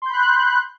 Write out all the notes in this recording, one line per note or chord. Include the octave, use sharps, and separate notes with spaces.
B5 C6 F#6 G6